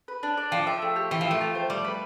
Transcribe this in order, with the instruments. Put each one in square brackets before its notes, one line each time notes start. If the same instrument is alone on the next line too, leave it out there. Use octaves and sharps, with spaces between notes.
[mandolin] B4
D4
D5
[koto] F3 [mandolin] G5
[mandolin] E5
A3
G4
[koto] E3 [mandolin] G5
[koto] F3 [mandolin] E5
[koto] A3
[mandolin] F4
C5
[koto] G3 [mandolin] D5
[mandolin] B4